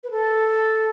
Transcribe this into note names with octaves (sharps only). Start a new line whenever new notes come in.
B4
A4